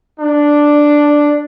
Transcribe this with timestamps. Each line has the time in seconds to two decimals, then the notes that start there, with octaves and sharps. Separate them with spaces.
0.20 D4